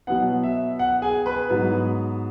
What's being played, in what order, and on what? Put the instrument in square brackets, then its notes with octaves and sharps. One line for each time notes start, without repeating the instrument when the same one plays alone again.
[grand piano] B2 F#3 B3 F#5
E5
F#5
G#4 G#5
B4 B5
G#2 F#3 B3